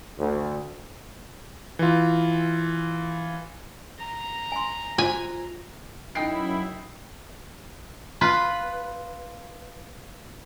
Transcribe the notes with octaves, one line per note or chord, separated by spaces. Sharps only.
D2
E3 F4
A#5
G#5 C6
F4 F#4 C5 G#5
F#2 D#4 E4 G5 C7
F4 B4